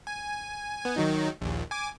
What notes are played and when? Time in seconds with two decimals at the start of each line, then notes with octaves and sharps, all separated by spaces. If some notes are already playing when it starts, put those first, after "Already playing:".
0.07 G#5
0.82 B3 G#5
0.96 D#3 F#3 D#4
1.41 A#1 D#2
1.71 G#5 D6